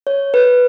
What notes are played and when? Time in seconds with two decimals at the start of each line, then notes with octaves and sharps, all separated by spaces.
0.07 C#5
0.34 B4